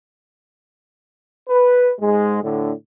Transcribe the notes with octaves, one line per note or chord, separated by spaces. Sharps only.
B4
G#2 G#3
A2 D3